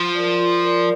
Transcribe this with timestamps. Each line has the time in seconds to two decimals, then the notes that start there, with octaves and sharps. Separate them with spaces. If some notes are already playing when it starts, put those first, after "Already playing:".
Already playing: F3 F4
0.15 A#4 D5
0.40 F4
0.64 A#4 D5